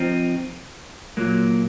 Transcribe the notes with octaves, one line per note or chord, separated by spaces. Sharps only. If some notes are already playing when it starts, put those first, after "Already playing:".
Already playing: F3 C4 D#4
A#2 F#3 A#3